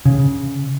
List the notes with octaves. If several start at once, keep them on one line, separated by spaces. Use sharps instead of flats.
C#3